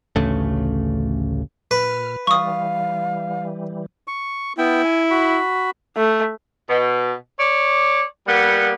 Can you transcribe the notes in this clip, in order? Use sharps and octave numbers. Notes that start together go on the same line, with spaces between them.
A1 D2 C#3 A3
A#2 B4 F6
E3 G3 F5 C#6 D#6
C#6
B3 E4 G5
G#5
F#4 B5
A3
B2
C#5 D5
G3 A#3 B3 F#5